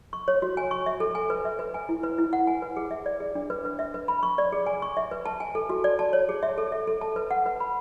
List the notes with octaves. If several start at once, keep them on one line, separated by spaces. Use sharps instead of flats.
C#6
C#5
F#4
G#5
C#6
E5
A4
G#5
B4
E5
B4
G#5
E4
B4
E4
F#5
G#5
B4
G#4
E5
D5
G#4
D4
B4
B4
E5
B4
B5
C#6
D5
G#4
G#5
C#6
E5
B4
A5
G#5
A4
F#4
D5
A5
C#5
G#4
E5
A4
E5
A4
A5
B4
F#5
B4
B5